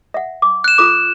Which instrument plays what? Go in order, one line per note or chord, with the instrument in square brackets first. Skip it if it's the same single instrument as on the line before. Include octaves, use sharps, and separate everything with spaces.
[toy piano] E5 F#5
D6
[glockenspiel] F#6 E7
[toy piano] F4 A4 D6